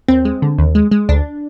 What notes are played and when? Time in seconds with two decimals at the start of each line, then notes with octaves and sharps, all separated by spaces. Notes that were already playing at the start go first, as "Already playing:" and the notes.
0.08 D#2 C4
0.25 G#3
0.42 D3
0.59 D#2
0.75 G#3
0.91 G#3
1.09 D2 D4